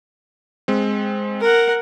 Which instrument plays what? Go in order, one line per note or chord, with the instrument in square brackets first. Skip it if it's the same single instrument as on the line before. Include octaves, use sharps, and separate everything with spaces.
[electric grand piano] G#3 C4
[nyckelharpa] A#4 F#5